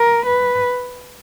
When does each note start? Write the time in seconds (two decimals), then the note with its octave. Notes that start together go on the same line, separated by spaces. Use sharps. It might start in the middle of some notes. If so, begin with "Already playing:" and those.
Already playing: A#4
0.26 B4